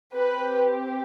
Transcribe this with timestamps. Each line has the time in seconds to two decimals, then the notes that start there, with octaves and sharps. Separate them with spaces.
0.15 C4 G4 B4